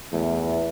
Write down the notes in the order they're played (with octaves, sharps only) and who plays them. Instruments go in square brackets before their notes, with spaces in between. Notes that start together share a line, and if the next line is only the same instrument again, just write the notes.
[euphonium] E2 [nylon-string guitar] A3